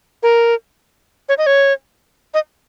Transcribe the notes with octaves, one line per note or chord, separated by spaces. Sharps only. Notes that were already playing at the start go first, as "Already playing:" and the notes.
A#4
C#5
D#5
C#5
D#5